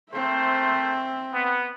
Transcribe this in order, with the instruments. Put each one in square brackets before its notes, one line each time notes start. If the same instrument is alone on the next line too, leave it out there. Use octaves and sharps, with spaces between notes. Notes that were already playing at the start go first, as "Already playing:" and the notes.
[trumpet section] A3 A#4 C5 [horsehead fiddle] C4 E5
[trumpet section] B3